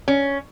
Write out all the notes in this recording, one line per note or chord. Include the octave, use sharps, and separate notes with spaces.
C#4